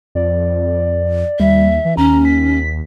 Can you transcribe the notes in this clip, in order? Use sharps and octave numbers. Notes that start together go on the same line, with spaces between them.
F2 D5
D#2 G3 E5
E3
D#2 C#4 A#5
B6